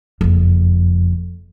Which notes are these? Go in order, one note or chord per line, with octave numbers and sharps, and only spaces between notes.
F#1 F2